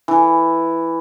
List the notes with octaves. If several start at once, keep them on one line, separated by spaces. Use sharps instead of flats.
E3